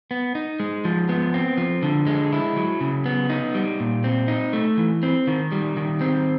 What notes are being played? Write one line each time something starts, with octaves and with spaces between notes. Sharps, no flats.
B3
D#4
G#3
F3
B3
C4
F3
D3
G#3
E4
F#3
C#3
B3
D#4
G3
A#2
C4
D#4
A3
E3
C4
D#3
G3
D#3
C4